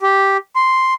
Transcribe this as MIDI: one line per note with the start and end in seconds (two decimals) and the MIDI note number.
0.01 0.37 67
0.56 0.94 84